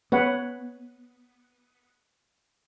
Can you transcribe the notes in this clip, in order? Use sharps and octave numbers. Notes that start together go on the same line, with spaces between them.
B3 B4 C#5 F#5